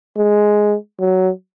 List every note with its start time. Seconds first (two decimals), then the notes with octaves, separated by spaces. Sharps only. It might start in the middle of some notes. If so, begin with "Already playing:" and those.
0.17 G#3
1.00 F#3